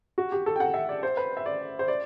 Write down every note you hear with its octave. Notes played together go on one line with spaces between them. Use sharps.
F#4
G4
A4
G5
F#5
E5
D5
C5
B4
E5
D5
C5
D5